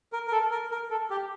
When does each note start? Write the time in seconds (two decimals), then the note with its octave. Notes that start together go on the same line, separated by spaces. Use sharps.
0.13 A#4
0.27 A#4
0.32 A4
0.51 A#4
0.71 A#4
0.91 A4
1.10 G4